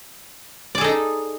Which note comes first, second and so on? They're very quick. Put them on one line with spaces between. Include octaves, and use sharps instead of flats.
D5 G#4 A4 D#4